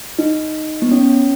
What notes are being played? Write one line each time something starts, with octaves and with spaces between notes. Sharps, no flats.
D#4
B3
C#4